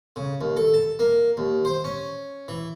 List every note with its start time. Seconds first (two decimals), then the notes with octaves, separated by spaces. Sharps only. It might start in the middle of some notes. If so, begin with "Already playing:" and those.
0.16 C#3
0.41 D#2
0.57 A4
0.74 A5
0.99 A#3
1.37 D#2
1.65 C5
1.84 C#4
2.48 E3